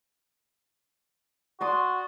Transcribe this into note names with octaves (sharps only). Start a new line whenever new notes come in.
F#4 D5 C6 D#6